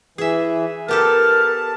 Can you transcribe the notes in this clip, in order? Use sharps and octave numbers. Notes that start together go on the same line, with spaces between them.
E3 G#4 E5
B3 G4 A4 A#4 A5 F6